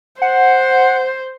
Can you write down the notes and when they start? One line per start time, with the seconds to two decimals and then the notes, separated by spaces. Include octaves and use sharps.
0.22 C5 F#5